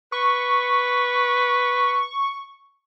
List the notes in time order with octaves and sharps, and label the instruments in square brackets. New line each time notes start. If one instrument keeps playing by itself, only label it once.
[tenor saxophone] B4 [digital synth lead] C#6